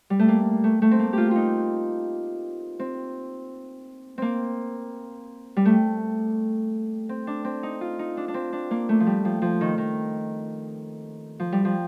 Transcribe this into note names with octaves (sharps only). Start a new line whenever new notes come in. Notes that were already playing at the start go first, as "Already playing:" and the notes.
G3
A3
A#3
A3
A3
C4
A#3
F4 G4
D#4 F4
C4
A#3 C4
G3
A3
C4
D4
C4
D#4
F4
D#4
D4
D4
C4
D4
A#3
A3
F3
G3
F3
F3
D#3
D#3
F3
G3
F3